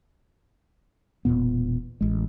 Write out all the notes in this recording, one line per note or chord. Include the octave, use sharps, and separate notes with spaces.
E1 E2 A#2 B3
A1 G#3